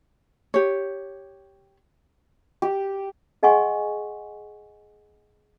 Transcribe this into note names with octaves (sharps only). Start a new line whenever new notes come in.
G4 C#5
G4
G#4 D#5 F#5 G#5 C6 C#6